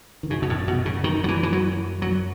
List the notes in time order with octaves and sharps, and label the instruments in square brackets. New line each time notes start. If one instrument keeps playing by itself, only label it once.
[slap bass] D#3
[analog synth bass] F#2 [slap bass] C#3
[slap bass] B2
A2
B2
C#3
D#3
F#3
E3
E3
F#3
F#3